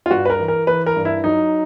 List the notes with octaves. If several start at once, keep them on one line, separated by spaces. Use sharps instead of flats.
F4
G2 F#4
B4
A#4
E3
A#4
E3 B4
A#4
G2
E4
F#3 D#4